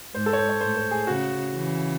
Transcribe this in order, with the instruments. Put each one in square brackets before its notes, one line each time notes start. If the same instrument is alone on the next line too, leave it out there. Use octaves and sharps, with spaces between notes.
[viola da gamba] G#2 [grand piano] C5
[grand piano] A4
C#5
C5
C#5
[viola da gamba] A2 [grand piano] C5
[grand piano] C5
G#4
[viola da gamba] C#3 [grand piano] F#4
[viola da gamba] C#3 E3